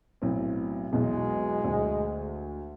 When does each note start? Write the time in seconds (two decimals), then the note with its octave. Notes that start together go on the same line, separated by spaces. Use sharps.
0.22 B1 A2 C4
0.93 B1 E2 B2 G#3
1.64 D2